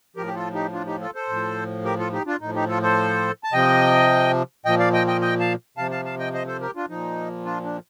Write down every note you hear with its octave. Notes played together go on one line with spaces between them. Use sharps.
A2 F3 G4 A#4
G4
F4 A4
D#4 G4
D4 F4
D#4 G4
F4 A4
A4 C5
A2 F3
G4 A#4
F4 A4
D#4 G4
D4 F4
A2 F3 D#4
D#4 G4
F4 A4
A4 C5
A5
C3 F3 D#5 G5
A#2 F3 D#5 G5
D5 F5
D#5 G5
D#5 G5
D#5 G5
F5 A5
C3 F3 F5 A5
F5 A5
F5 A5
D#5 G5
C5 D#5
A4 C5
G4 A#4
D4 F4
A#2 F3 D#4
D4 F4
D4